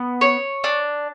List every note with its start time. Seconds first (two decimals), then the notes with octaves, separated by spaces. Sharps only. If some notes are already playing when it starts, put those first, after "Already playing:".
Already playing: B3
0.21 C#5
0.64 D4